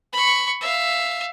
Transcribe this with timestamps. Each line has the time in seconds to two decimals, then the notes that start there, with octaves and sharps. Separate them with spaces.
0.13 B5 C#6
0.61 E5 F5